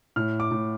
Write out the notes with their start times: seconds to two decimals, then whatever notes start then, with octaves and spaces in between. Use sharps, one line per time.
0.16 A2 F6
0.40 D6
0.51 A2